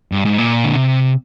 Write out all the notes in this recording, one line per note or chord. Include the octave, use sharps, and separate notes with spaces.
G2
G#2
A#2
D3
C3